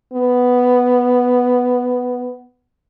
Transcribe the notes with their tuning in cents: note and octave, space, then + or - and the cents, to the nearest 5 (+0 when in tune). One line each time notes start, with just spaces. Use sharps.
B3 +5